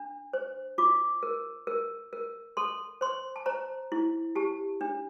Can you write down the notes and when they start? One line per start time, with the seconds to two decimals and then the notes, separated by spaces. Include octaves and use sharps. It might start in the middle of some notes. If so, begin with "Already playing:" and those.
Already playing: D4
0.33 C5
0.78 F4 D6
1.23 A#4
1.67 A#4
2.13 A#4
2.57 A4 C6
3.01 C5 C6
3.36 A5
3.46 C5 A#5
3.92 E4
4.35 G4 A5
4.81 D4